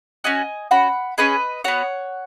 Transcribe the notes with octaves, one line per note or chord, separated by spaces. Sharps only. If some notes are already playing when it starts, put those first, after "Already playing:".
C#4 F#4 D#5 G#5
C#4 F#4 F#5 B5
C#4 G#4 B4 D#5
B3 F#4 C#5 F#5